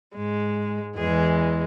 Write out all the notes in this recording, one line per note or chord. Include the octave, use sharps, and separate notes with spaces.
G#2 G#3
E2 E3 G#3 G#4